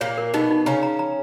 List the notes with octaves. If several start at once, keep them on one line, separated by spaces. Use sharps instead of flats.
A#2 A#3 C#5
A#4
B2 B3 D#4
D#4
C#3 C#4 A#5
A#5
A#5